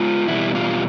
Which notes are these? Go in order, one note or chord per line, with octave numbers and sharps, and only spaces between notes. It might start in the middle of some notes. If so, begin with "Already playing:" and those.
Already playing: G#3 B3 F4
E2 B2 G3 E4
F4